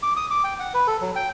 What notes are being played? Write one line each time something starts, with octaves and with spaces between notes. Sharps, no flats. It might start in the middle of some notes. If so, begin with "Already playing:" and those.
D6
D#6
D6
G5
F#5
B4
A4
F#3
G5